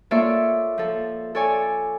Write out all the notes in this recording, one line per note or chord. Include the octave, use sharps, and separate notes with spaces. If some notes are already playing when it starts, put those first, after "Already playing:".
A#3 F4 A4 C#5 D5 E5
F3 A4
A4 C#5 D5 G#5